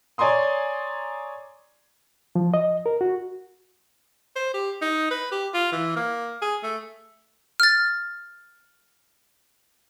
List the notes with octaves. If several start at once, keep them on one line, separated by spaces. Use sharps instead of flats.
C#5 D5 G#5 A#5 C6 D#6
F3
D#5
A#4
F#4
C5
G4
D#4
B4
G4
F4
E3
A#3
G#4
A3
F6 A6